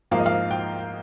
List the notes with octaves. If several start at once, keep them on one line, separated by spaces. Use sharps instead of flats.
G#2 F3 A#3 F5
D#5
F5
G5